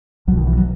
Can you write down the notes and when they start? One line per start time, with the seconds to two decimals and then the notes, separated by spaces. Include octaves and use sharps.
0.27 B1 F#3
0.32 B2
0.37 D#3
0.47 E3
0.57 F#3